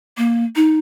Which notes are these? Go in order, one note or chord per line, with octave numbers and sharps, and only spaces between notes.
A#3
D#4